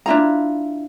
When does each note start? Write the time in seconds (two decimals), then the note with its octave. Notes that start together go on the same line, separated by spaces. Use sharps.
0.06 D4 E4 F4 A#5